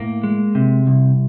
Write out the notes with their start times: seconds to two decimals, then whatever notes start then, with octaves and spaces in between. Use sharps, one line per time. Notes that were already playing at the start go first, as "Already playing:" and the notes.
Already playing: A2 A#3
0.24 G#3
0.55 C3
0.87 C2